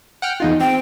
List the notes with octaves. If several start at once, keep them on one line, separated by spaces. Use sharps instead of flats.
F#5 G5 F6
E2 D#4 F4
C4 G5